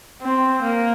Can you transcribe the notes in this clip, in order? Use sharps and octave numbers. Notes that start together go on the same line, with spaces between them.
C4
A#3